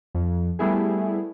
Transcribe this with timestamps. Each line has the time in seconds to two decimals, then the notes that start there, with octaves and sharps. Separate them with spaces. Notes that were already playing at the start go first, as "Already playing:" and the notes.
0.15 F2
0.59 G3 A3 B3 E4 G#4